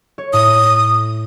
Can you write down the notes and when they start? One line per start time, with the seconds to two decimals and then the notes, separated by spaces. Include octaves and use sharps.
0.18 C#5
0.33 A2 D#6